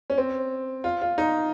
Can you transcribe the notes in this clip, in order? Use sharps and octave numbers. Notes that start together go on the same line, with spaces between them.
C#4
C4
F4
F4
D#4